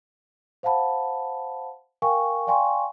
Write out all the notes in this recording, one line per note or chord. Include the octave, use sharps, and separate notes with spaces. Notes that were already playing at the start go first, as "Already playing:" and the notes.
C5 F5 F#5 A5 B5
A#4 F5 G5 G#5 C#6
D5 F5 G5 G#5 C6 C#6